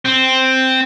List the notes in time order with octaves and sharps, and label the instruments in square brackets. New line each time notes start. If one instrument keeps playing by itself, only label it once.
[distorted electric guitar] C4